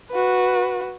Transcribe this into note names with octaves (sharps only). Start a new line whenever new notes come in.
F#4 B4